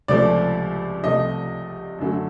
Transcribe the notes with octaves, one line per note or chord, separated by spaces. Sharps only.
C#2 C3 F3 A3 D5
C2 C3 F3 A3 D#5
F#2 D3 F#3 A3